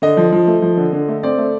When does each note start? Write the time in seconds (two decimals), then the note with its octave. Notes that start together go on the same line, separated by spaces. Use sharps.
0.02 D3 D#5
0.17 F3
0.32 F3
0.47 A3
0.62 F3
0.77 D3
0.93 D3
1.08 A3
1.23 C4 D5
1.38 A3